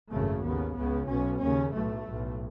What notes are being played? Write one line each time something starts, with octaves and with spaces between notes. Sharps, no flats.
G#1 F#2 C#3 A3
D#2 C#3 B3
C#2 C#3 B3
B1 B2 C#4
D#2 C#3 C#4
B1 A2 A3
B1 A2